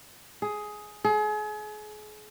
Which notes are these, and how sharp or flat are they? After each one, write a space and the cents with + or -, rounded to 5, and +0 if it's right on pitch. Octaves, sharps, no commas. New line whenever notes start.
G#4 +10
G#4 +35